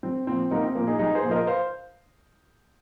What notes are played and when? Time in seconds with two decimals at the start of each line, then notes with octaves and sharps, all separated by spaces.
0.03 C2 C4
0.27 A#2 F3 C4
0.51 C2 A#3 D#4
0.63 C4
0.75 A#2 F3 A#3
0.87 D#4 G#4
0.99 C2 D#4 G#4
1.15 G#4 C5
1.23 A#2 F3
1.31 A#4 D#5
1.47 C5 F5